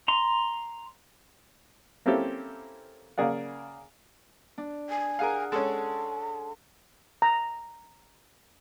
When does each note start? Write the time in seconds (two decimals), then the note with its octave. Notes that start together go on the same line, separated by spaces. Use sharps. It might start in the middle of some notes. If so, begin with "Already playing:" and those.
0.08 A#5 C6
2.06 A#3 C4 C#4 E4 G4 A4
3.18 C#3 A#3 G#4 D5 F#5
4.58 D4
4.90 G#5
5.19 G#4 A#4 F5 F#5
5.52 G#3 C#4 A4 A5
7.22 A#5